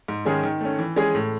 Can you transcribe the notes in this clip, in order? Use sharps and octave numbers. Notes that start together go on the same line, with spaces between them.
G#2
D#3 G#3 C#4 G#4
D#3
A3 C#4
E3
G#3 C#4 G#4
A2